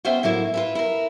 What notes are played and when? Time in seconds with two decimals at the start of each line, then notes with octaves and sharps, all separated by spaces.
0.05 B3 C#4 F4 C5 E5 G5
0.23 A2 F#3 A#3 E4
0.54 F4 B4 E5
0.75 E4 A#4